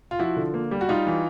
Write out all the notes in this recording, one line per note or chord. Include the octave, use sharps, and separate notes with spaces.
F4
F3 E4 F#4
D3
A#3
G3
F#4
G3 D#4 F4
E3